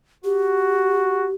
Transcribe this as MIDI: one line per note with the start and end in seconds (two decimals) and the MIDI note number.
0.24 1.28 66
0.24 1.35 67